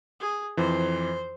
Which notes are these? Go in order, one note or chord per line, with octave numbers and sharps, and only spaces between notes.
G#4
F2 E3 C5